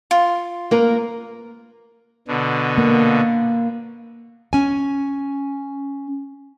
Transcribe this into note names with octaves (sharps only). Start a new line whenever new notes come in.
F4
A#3 A#4 B4
B2 D3
A#3
C#4 G#5